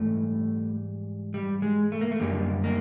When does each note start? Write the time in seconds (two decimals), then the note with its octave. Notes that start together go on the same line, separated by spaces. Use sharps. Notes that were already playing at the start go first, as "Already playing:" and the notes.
Already playing: G#2 E3 G3 A3
1.34 G3
1.62 G#3
1.92 A3
2.01 A#3
2.11 A3
2.20 F#2 D3 G3 A#3
2.64 A#3